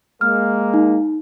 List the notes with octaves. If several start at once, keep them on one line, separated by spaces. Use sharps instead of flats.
G#3 A#3 F6
D#4